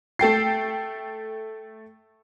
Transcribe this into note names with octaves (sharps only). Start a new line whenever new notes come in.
A3 A4 G5 C7